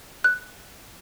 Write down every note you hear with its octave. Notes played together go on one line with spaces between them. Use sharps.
F#6